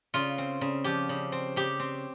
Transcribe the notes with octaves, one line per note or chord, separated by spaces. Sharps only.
C#3 F4
C4
C#3
F3 G4
C#3
C4
C#3 G4
C4